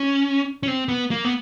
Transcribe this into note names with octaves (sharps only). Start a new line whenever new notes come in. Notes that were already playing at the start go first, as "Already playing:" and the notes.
Already playing: C#4
C#4
C4
B3
A#3
B3